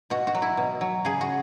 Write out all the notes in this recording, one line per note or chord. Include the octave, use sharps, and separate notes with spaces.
B2 F#4
F#4
F#3
E4
B2
F#3
C#3 G#4
F#4